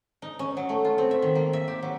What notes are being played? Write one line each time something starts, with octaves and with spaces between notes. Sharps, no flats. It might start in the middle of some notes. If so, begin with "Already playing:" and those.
D#4
C#4
F#3
A3
F4
C4
E5
D#3
A#3
E5
G4
F#3